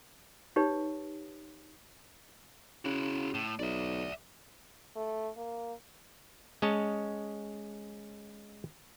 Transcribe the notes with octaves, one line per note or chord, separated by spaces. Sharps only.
D#4 G4 B4 C#5
C#3 E4 F#4
A2
B1 D5 E5
A3
A#3
G#3 C#4 C#5 D#5 A5